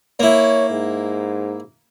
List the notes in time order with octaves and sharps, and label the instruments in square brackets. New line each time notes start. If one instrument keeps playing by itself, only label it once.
[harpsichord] A#3 E4 [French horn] C#5
[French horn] G#2